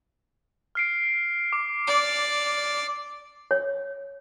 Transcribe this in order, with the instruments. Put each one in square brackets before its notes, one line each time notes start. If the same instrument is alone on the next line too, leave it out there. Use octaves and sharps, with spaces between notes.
[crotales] F6 C7 D7
D6
[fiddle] D5
[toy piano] C#5